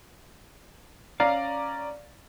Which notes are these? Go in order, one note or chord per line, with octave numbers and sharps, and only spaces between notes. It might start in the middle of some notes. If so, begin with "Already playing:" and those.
C#4 D5 F5 A#5